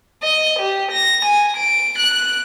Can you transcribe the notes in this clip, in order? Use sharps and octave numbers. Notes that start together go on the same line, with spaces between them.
D#5
G4
A#6
G#5
D7
F#6